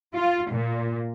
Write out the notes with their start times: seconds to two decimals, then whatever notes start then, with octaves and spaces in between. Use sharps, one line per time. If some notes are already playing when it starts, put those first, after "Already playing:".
0.15 F4
0.50 A#2